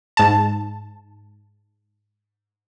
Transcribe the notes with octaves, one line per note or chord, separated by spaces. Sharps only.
G#2 A5